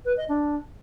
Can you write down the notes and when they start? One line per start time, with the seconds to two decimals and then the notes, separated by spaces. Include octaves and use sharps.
0.05 B4
0.17 D#5
0.29 D4